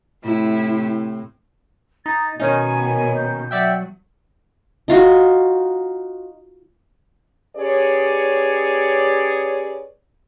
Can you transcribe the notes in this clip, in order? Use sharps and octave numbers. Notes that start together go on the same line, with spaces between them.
A2 C3 E4
D#4 A6
B2 D#3 B3 C#4 D#4 G#5
G6
F#3 D5 E5 F#5 G5
D#4 F4 F#4
C#4 G4 G#4 B4 C#5 D5